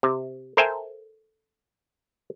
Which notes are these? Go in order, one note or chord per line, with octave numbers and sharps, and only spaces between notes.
C3
A4 A#4 C5 E5 G5 G#5